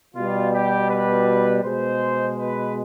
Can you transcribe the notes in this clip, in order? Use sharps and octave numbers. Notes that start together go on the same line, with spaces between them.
B2 G3 F4
G4
B4
B2 G#3 C5
B4